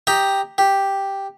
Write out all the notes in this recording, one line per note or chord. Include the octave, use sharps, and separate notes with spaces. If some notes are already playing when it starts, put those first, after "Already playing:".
G4 D#5 G5 A#5
G4